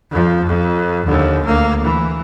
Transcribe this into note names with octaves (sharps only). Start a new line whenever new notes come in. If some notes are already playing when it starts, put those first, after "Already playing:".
F2 F3
F2
D#2 D3
D2 A#3
E3